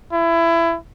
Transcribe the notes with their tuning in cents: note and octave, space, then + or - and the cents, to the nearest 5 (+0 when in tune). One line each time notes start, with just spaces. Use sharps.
E4 +20